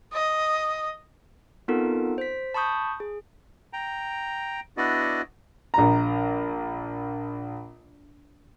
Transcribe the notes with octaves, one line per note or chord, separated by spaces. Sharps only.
D#5
B3 C4 D#4 F4 A4 A#4
C5 B6
A5 B5 C#6 D#6 G6
G#4
G5 A#5
B3 D4 E4 F#4 D5 D#5
A#1 A#5